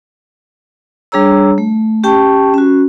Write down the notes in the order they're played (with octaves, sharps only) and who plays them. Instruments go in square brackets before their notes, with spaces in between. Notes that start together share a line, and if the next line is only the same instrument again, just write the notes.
[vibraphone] G3 D4 G#4 C#5 A#5 E6
A3
C#4 G4 G5 A5 C#6
C#4 F#4